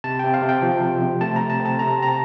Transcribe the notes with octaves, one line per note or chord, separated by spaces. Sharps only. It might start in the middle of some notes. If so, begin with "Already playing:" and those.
C3 A5
C3 G5
F5
C3
G5
F3
C3
C3
A3 A5
C4 A#5
A5
C4
A5
C3 A#5
C4 A#5
A5